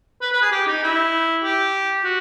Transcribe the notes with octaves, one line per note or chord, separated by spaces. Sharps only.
B4
B4
G#4
G4
D#4
E4
G4
F#4